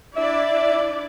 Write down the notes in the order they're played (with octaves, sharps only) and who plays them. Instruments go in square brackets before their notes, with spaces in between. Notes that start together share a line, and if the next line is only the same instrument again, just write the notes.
[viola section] D4 E4 D5 [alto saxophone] E5